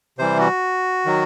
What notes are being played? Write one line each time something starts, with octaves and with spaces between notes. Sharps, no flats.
C3 E3 G3 C5
F#4
D#3 F#3